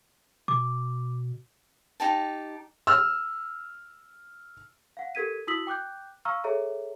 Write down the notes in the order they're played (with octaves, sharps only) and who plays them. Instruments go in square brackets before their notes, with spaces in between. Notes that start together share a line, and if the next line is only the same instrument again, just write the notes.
[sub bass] B2 [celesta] D6
[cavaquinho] D#4 G4 A5
[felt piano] E6 F6
[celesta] F5 F#5
G4 A4 A#4 G#6 B6 D#7
E4 F#4 D#6 E6 B6 F#7
G5 D6 F#6 G6
F5 A#5 C#6 E6 F6
G#4 A4 C#5 E5 A#5